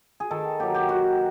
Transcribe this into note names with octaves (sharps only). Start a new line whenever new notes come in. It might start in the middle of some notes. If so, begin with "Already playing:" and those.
G#4
D#3 A4
F#3 A#3 G4
G4
D#3 F#4